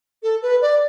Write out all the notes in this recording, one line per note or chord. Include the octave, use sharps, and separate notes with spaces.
A4
B4
D5